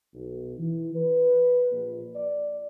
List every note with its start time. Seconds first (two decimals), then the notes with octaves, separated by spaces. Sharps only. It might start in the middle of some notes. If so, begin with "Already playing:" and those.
0.14 B1
0.58 E3
0.95 B4
1.71 A#1
2.15 D5